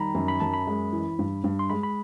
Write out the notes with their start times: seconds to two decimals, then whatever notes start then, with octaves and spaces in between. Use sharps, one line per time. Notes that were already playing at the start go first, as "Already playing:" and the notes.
Already playing: D#3 G3 A#5 B5
0.15 F#2
0.28 B5
0.40 F#2 A5
0.53 B5
0.67 G#3
0.93 E3
1.19 G2
1.44 G2
1.59 C6
1.70 G#3 B5
1.83 B5